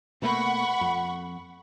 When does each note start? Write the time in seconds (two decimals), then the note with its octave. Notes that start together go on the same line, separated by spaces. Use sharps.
0.22 B2 A3 A#3 F#5 B5 C#6
0.81 F2